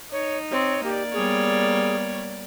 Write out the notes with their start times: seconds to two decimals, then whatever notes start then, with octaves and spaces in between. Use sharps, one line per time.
0.12 D#4 C#5
0.51 C4 C#5
0.84 A#3 G4 D5
1.13 G3 B3 G#4 C#5